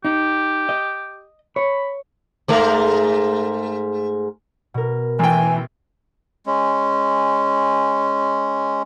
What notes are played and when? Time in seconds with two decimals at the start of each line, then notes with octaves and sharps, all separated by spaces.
0.05 D#4 G4
0.69 D#5
1.56 C#5 B5
2.48 G#2 A3 A#4
4.74 B2 A#4
5.19 A1 E3 E5 G5 G#5
6.46 G#3 C#4